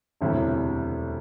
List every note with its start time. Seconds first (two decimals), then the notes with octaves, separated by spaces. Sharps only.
0.21 E1 D2 C3 G3 E4